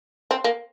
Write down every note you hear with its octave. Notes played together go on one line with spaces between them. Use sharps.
C4
A#3